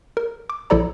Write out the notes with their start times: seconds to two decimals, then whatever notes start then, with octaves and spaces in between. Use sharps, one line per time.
0.17 A#4
0.50 D6
0.70 A#1 F3 E4 A4 D5 A#5